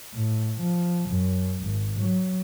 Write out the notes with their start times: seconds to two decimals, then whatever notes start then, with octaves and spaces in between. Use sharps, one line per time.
0.14 A2
0.60 F3
1.09 F#2
1.63 G#1
1.99 F#3